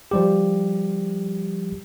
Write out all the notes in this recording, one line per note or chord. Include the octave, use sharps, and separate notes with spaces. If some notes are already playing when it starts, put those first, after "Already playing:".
F3 G3 G4